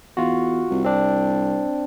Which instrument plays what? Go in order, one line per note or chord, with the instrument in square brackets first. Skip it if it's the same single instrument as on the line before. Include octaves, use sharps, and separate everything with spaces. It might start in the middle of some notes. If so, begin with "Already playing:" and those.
[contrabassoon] E2 [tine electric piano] F4 F#4
[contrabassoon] C2
[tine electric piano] C4 D4